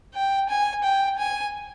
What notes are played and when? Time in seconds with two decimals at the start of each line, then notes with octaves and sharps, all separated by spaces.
0.14 G5
0.49 G#5
0.84 G5
1.19 G#5